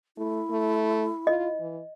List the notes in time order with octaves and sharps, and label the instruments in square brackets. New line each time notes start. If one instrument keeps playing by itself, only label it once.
[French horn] A3 [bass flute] E4
[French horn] A3
[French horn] F4 [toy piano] D#5
[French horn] E3